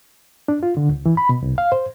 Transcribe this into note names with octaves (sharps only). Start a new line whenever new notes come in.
D4
F4
D3
C#2
E3
B5
B2
C2
F5
C5